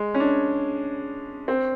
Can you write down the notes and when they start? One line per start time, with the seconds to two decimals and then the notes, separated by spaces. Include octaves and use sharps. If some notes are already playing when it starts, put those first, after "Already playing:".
Already playing: G#3
0.14 C#4
0.20 D4
1.48 C4